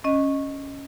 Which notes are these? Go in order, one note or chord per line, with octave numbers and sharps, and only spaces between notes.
C#4 D#5